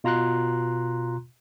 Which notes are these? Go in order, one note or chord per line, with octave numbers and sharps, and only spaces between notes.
B2 F4 A#5 C6 F#6